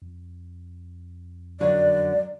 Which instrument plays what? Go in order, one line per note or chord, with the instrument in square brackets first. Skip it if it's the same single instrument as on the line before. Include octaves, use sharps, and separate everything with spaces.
[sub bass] F2
[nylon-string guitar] F#2 D3 F#3 [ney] D5